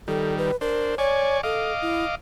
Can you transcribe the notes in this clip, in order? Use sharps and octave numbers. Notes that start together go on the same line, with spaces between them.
D#3 G3 A4
B4
D4 A#4 C5
C#5 D5 G#5 C#6
A4 D#5 F5 D6
E4